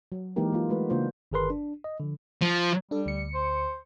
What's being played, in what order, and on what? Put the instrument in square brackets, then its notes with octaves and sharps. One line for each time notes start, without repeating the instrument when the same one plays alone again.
[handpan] F#3
E3 G#3 A#3 D#4 G4 A#4
A#3 F4
G#3 A3 F#4 B4
C#3 A#3 D4 F4 C5
[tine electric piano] G1 D#3 G#4 A#4 B4 C6
D4
D#5
D3 F3
[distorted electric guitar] F3
[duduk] G3 [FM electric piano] D4 A4
[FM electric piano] D2 C#7
[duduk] C5